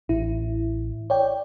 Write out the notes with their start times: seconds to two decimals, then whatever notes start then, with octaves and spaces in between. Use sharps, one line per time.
0.09 A1 E4
1.10 C#5 D5 G5